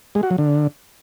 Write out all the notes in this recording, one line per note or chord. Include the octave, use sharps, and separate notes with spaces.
G#3
F#4
F#3
D3